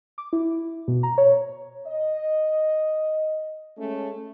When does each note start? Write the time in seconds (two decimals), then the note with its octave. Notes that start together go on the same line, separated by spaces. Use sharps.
0.18 D6
0.33 E4
0.88 B2
1.03 A#5
1.18 C#5
1.87 D#5
3.78 G#3 A3 C#4